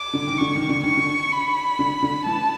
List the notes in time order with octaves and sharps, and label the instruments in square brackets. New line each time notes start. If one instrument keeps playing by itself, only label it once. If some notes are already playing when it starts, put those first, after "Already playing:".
Already playing: [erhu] D6
[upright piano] D3
D#3
[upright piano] D3 [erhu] C#6
[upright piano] D#3
D3
[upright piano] D#3 [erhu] C#6
[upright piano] D3
[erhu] B5
[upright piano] D3
D3
[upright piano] E3 [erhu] A5